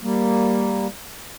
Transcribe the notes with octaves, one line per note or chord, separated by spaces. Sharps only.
G3 A#3